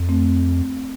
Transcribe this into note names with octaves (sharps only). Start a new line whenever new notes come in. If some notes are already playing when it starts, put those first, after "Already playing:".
Already playing: F2
A3 C4